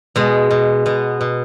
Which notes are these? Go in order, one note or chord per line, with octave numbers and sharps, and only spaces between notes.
B2 G#3
B2
B2 B3
B2